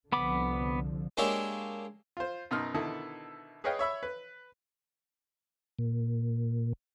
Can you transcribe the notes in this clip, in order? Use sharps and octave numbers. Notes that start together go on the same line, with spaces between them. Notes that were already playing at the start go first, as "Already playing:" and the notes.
C2 D3 F3 B3 B5 D6
G#3 A#3 D4 G4 C#5 E5
F4 C5
F#2 B2 D#4 D#5 C6 F6
B2 D3 D#3 E4 A4 D#6
G#4 B4 C#5 D#5 F5 G5
C#5 E5 B5 E6
B4
A#2